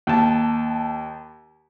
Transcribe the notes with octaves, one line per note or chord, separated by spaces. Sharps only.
D#2 A5